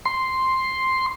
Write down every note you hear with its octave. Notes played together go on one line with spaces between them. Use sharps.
C6